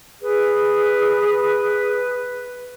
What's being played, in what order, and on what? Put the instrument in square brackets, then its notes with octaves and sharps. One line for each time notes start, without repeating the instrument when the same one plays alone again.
[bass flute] G#4 [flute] B4